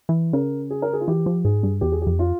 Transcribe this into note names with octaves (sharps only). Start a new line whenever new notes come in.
E3
C#3 A#4
G#4
A#4
G#4
F4
E3 G4
F3
G#2 G#4
G2
E2 G4
G#4
G4
F2
F4